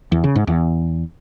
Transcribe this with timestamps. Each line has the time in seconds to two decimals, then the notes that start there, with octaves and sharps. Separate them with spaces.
0.12 E2
0.24 C#3
0.36 G#2
0.47 E2